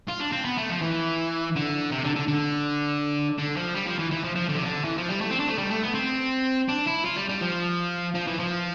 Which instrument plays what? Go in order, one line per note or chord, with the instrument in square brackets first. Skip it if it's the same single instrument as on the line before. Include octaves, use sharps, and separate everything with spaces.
[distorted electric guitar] F4
D4
C4
B3
A3
F3
E3
D3
C3
D3
D3
D3
D3
F3
G3
F3
E3
E3
F3
F3
D3
C3
D3
E3
F3
G3
A3
C4
D4
A3
G3
A3
B3
C4
D4
E4
F4
G3
G3
F3
F3
E3
F3